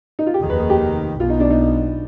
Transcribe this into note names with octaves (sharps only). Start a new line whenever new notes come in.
D#4
F4
G4
F1 D#2 D#3 G#4
B4
G#4
G4
B1 B2 B3 F4
D#4
D4
D#4